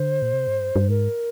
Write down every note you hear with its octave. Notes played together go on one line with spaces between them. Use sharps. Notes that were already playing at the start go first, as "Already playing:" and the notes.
Already playing: D3 C5
A#2
C3
G#2
G2
G2
G#2 A#4